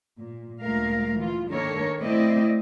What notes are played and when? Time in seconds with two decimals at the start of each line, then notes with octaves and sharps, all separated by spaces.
0.20 A#2
0.62 D2 A#2 G#3 A3 A#4 F5
1.16 E3 F4
1.49 D#3 A#3 D4 A4 A#4 C#5
2.00 A3 C4 E4 D5 D#5